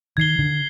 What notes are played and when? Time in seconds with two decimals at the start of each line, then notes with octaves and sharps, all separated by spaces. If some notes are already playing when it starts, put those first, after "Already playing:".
0.17 D#3 G#6 C7 G7
0.39 D3